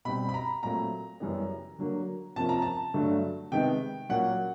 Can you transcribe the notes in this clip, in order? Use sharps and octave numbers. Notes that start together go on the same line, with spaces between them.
B2 G3 C4 B5
B5
A#5
A#2 F#3 A3 C4 A#5
F#2 C#3 E3 G3 B3
D3 F#3 A#3
C3 F3 A#3 C#4 A5
A#5
A5
G2 D3 F#3 A3
C3 D#3 G#3 B3 G5
A#2 F#3 A#3 C#4 F#5